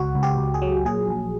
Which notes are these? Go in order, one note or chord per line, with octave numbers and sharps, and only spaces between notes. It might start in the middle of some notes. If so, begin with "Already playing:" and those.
Already playing: C#2 F#4
C#2
G4
C#2
G#4
F#3
A#2 G#4
A#1